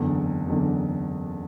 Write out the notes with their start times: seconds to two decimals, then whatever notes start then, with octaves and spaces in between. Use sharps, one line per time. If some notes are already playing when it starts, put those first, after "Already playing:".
Already playing: F#1 E2 D3
0.47 F#1 E2 D3